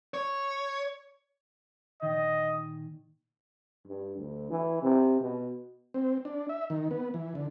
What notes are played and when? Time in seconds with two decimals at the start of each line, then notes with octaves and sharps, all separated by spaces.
0.14 C#5
2.02 A#2 D#3 D#5
3.87 G2
4.18 D2
4.51 E3
4.82 C3
5.21 B2
5.94 C4
6.25 D4
6.49 E5
6.70 D#3
6.91 B3
7.14 E3
7.35 D3